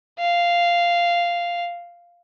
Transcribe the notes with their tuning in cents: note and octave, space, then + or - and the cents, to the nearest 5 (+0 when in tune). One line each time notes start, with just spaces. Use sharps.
F5 -5